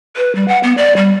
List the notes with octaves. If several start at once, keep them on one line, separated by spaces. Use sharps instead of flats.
B4
G3
F#5
B3
D5
G3